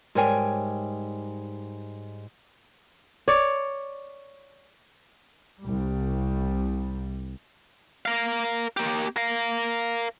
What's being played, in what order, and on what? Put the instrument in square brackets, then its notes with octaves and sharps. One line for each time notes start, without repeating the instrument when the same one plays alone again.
[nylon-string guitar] G#2 G3 A#4 C#5 G5 G#5
[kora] C#5 D5
[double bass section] C2 G3
[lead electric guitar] A#4 F5
A#3 G4
A#4 F5